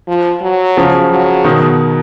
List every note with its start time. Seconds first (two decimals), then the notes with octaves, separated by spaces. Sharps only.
0.08 F3
0.42 F#3
0.77 C#3 F3
1.11 F#3
1.44 B2 D#3